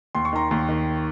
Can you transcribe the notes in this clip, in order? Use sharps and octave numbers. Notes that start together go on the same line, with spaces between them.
D#2 C6
C#6
D#3 A#5 C6
D#2
D#3